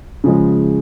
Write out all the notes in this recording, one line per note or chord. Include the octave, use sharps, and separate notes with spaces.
C#3 F3 G#3